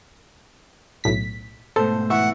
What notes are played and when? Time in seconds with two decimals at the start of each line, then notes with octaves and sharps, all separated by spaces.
1.04 B1 A2 B6
1.76 G#2 B2 A3 A4 C5
2.10 E3 E5 F#5 C#6